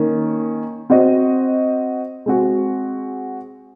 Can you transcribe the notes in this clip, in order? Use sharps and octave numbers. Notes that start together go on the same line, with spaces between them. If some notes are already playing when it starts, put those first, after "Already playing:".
Already playing: D#3 A#3 C#4
C4 F#4 C5 D#5
G#3 C4 F#4